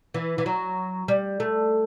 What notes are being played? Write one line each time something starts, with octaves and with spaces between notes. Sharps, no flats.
E3
E3
F#3
G3
A3